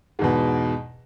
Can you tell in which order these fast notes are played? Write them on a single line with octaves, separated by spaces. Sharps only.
G#2 E2 B2